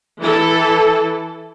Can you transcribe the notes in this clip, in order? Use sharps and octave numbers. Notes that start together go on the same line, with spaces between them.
E3 A4